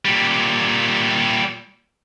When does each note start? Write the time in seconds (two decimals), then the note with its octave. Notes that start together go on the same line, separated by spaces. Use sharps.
0.05 A#2 G3